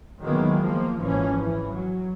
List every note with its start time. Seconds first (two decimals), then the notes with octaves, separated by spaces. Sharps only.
0.22 D#3 E3 F#3 G#3 A#3 B3
0.61 F3 A#3
0.99 G#1 G#2 E3 F3 C#4
1.41 E3
1.73 F#3